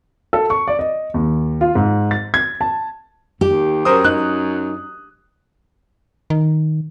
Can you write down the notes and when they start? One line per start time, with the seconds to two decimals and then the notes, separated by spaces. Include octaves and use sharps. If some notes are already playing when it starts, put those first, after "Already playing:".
0.33 A4
0.50 C#6
0.68 D5
0.79 D#5
1.14 D#2
1.61 F4
1.75 G#2
2.11 A6
2.34 G#6
2.61 A5
3.41 D#2 G4
3.85 F#2 A#4 C5 D#6
4.04 D#4 F#6
6.30 D#3